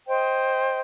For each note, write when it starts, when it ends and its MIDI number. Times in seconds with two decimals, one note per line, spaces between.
0.08 0.81 72
0.08 0.81 75
0.08 0.81 79